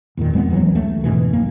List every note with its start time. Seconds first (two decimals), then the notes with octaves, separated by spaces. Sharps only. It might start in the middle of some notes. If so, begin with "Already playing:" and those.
0.17 E1 E2 A#2 D#3
0.34 F2 G#3 A3 B3
0.50 A1 D#2 E3 F#3
0.72 C#2 A3
1.04 F2 G#2 B2 E3
1.33 B1 A#3